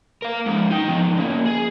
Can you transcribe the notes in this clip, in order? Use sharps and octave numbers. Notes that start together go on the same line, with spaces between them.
A#4 F5
G#2 F3
D#4 G5
F3 B3
C#3 A#3
G#4